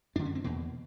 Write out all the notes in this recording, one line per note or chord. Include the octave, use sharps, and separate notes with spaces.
F#2 D3 D4
C#4
C4
E2 B2 A#3